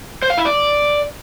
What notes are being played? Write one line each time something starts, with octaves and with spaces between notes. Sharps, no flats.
C5
F5
E4
D5